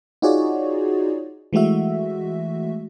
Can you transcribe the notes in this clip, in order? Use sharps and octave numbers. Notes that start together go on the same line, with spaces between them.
D#4 F4 F#4 G#4 C#5 D5
E3 G#3 A3 F#4 E5